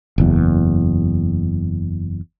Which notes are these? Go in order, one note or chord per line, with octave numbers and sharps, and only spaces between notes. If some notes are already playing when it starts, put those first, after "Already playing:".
F#1 E2